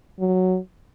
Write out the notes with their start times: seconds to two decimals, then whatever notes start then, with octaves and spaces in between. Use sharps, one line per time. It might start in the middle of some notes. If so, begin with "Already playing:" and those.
0.19 F#3